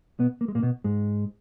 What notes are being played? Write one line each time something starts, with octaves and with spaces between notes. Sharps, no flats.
B2 B3
A#3
G#3
A#2 A#3
B2 B3
G#2 G#3